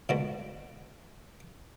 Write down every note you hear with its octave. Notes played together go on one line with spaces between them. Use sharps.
D2 G#2 B2